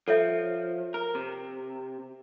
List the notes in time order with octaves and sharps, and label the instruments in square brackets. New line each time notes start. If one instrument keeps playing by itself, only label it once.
[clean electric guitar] F3 [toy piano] A4 C#5 E5
[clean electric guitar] A#4
C3